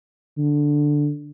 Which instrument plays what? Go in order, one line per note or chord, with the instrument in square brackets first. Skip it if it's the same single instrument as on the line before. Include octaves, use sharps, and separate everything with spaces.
[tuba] D3